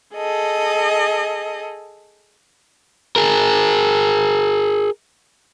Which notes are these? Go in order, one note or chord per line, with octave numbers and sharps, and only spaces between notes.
G#4 A4 D#5
G#4 A#4